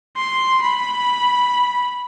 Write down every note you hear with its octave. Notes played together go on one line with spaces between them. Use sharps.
C6
B5